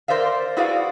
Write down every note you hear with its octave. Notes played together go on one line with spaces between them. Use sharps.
A#4 C5 D5 E5 F5
E4 F#4 G#4 B4 D5 F5